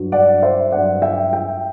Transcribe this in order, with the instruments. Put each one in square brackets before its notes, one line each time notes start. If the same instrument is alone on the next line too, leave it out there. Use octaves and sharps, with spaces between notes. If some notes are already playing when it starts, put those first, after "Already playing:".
Already playing: [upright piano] G2 F#3
D5 F#5
C5 E5
G2 F#3 D5 F#5
E5 G5
E5 G5